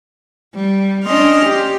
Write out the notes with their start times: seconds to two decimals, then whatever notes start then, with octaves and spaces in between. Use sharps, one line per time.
0.55 G3
1.05 C#4 D4 D#5 C6 F6
1.44 G4